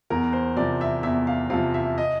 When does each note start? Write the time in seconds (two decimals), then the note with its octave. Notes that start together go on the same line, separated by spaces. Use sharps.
0.10 E2 A#4
0.33 C5
0.56 C3 F3 D5
0.81 E5
1.03 E2 E5
1.27 F5
1.50 C3 F3 F5
1.74 E5
1.98 D#5